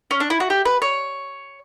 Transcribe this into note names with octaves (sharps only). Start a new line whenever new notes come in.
C#4
D4
E4
F#4
G4
B4
C#5